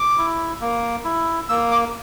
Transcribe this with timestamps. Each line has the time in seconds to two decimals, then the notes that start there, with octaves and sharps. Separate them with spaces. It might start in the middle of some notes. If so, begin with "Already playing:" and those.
Already playing: D6
0.18 E4
0.61 A#3
1.05 E4
1.49 A#3 E6
1.71 D6